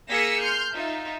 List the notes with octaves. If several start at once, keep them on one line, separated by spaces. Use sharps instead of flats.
A#3 G#4 E6 A#6 B6 C#7
C6 F6 G6
D#4 F4 E5